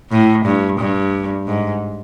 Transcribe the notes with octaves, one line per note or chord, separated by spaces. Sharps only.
A2
G2
G2
G#2